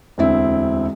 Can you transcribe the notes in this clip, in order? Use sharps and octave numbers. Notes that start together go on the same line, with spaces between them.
E1 D2 C4 E4